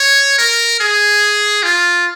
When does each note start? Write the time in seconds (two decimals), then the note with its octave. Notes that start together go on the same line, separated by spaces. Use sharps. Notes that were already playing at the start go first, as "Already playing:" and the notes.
Already playing: C#5
0.38 A#4
0.80 G#4
1.63 F4